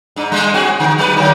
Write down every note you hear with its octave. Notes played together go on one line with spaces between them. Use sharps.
G#2 D4
G3 G#3
C4 F#4 G#4
D3
F#3 B4
D3 F#3 A#3